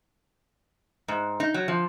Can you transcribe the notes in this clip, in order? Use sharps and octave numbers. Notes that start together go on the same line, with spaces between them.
G#2
D#4
F#3
F3